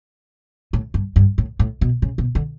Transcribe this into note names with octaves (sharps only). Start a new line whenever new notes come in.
A2
G2
G2
A2
A2
B2
C#3
B2
D3